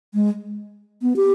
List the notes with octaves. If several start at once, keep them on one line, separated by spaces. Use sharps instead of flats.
G#3
B3
G4